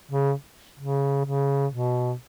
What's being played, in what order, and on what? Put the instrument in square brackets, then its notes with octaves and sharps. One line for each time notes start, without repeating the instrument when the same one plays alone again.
[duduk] C#3
C#3
C#3
B2